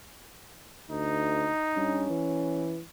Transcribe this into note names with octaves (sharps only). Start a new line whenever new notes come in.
D2 D#4
G2 C#4
E3